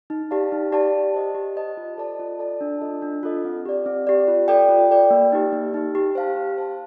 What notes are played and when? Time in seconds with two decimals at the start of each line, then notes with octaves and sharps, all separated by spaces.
0.10 D#4
0.31 G4 D5 F5 A5
0.52 D#4
0.72 G4 D5 F5 A5
0.93 G4
1.14 C5 D#5 A5
1.35 G4
1.55 C5 D#5 A5
1.77 F4
1.98 A4 D5 A5
2.19 F4
2.39 A4 D5 A5
2.61 D4
2.81 F4 A4 D#5
3.02 D4
3.23 F4 A4 D#5
3.45 C4
3.66 G4 D5
3.86 C4
4.07 G4 D5
4.28 F4
4.48 A4 D5 G5
4.69 F4
4.91 A4 D5 G5
5.11 A#3
5.32 D#4 G4
5.53 A#3
5.74 D#4 G4
5.95 G4
6.15 C5 F5 A5
6.36 G4
6.58 C5 F5 A5